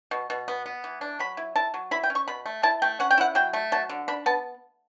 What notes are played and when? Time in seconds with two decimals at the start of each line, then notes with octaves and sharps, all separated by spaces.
0.11 B2
0.30 B2
0.48 B3
0.66 B3
0.84 E3
1.01 D4
1.19 F#3 B5
1.37 E4
1.56 E4 A5
1.74 F#3
1.91 E4 B5
2.03 G5
2.10 C#4
2.15 C#6
2.28 B2 B5
2.46 A3
2.63 E4 A5
2.82 A3 G5
3.00 C#4 F#5
3.11 G5
3.18 E4 F#5
3.35 F#3 G5
3.53 A3
3.72 F#3 A5
3.89 D3
4.08 D4 B5
4.26 B3 A5